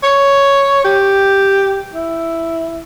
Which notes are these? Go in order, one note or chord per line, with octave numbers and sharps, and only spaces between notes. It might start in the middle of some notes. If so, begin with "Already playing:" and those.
C#5
G4
E4